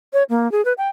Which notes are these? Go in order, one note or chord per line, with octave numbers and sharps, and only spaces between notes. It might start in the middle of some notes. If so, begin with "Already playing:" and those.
C#5
A#3
G#4
B4
G5